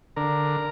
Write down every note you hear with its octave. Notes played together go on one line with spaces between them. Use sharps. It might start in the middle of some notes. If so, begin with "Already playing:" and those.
D3 A#4